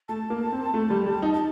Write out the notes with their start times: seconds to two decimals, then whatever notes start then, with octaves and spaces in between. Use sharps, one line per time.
0.09 A3 A5
0.30 A#3
0.52 C4
0.74 A3
0.90 G3
1.06 G3
1.22 D#4
1.34 A5